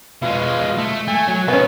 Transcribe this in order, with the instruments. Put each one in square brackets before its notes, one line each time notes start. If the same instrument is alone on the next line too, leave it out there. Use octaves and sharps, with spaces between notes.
[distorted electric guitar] B2 G#3 [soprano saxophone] F4
[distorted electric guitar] A3
[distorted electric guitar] A3 [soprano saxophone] G#5
[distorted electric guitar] F#3
[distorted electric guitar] B2 A3 [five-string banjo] B3 C#4